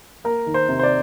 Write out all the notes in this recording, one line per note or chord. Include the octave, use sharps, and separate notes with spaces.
A#3 A#4
D#3
C5
C3
C5
D5